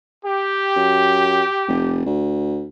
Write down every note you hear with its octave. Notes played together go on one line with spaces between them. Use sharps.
G4
F#2
F1
D2